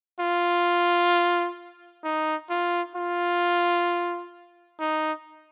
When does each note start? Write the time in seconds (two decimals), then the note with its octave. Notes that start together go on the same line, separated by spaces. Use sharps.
0.20 F4
2.04 D#4
2.50 F4
2.96 F4
4.80 D#4